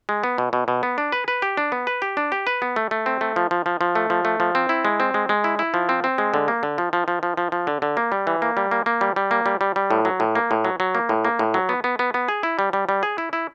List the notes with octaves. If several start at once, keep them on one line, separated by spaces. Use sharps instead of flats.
G#3
B3
B2
B2
B2
B3
D4
B4
B4
G4
D4
B3
B4
G4
D4
G4
B4
B3
A3
A3
C4
A3
F3
F3
F3
F3
A3
F3
A3
F3
C4
E4
G#3
C4
G#3
G#3
E4
E4
F3
C4
C4
G#3
D3
A#3
D3
F3
F3
F3
F3
F3
F3
D3
D3
A#3
G3
E3
A#3
G3
A#3
A#3
G3
G3
A#3
G3
G3
G3
A2
F#3
A2
A#3
A2
F#3
F#3
A#3
A2
A#3
A2
F#3
B3
B3
B3
B3
G#4
E4
G3
G3
G3
G#4
E4
E4